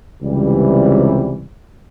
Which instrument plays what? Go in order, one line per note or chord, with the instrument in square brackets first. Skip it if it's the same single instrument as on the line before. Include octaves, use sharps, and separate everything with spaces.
[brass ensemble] C#2 C3 E3 G3